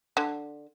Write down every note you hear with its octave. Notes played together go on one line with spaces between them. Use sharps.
D3